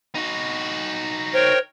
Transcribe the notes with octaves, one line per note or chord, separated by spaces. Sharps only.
D#4 F#4
A#4 C5 C#5 G5